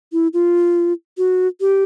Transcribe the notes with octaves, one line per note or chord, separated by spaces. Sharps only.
E4
F4
F#4
G4